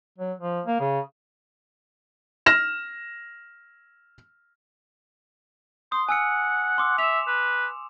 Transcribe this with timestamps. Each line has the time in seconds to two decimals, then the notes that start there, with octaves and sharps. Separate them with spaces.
0.18 F#3
0.40 F3
0.66 A#3
0.80 C#3
2.46 F6 A#6 E7
5.92 C6 D#6
6.09 F#5 G#5 E6 C#7
6.78 C6 D6 E6
6.98 E5 E7 F7
7.27 B4